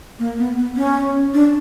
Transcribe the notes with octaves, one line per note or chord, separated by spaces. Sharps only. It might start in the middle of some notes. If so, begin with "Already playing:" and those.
A#3
B3
B3
C#4
D4